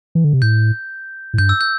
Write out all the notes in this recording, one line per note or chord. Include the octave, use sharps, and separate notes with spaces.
E3
D3
C3
A2 G6
A2
G2 G6
E6
G6